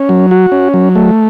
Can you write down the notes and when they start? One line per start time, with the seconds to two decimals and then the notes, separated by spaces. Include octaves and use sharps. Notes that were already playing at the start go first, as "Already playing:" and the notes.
Already playing: C#4
0.09 F#3
0.31 F#4
0.52 C#4
0.74 F#3
0.96 A3